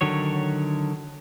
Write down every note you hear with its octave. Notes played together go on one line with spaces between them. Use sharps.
D3 D#3 F#3 C#5